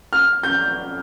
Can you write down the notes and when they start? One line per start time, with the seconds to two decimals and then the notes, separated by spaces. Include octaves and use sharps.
0.13 F6
0.43 G6